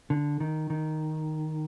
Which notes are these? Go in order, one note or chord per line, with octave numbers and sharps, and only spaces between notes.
D3
D#3
D#3